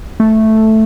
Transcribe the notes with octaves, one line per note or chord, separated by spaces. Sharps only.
A3